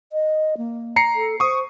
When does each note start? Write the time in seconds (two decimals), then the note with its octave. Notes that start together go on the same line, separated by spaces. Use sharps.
0.13 D#5
0.57 A#3
0.96 A#5 C7 C#7
1.16 A4
1.40 C5 C#6 D#6